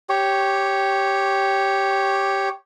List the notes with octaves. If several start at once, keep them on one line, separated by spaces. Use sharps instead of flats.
G4 C#5